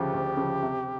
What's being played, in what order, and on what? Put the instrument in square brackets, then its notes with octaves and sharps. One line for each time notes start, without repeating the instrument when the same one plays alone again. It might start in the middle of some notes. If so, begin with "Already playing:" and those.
Already playing: [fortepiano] D2 C#3 F3 [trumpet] G4
[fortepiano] D2
C#3 F3
C3